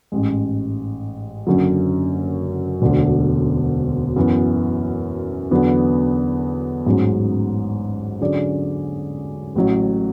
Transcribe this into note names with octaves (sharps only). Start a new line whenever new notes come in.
A1 G#2 G#3
F#1 F#2 D3 F#3
E1 D2 D3
F#2 E3 B3
E2 D3 F#3 B3
A1 G#2 F#3 C#4 G#4
D3 F#3 C#4 G#4 D5
A1 A2 F#3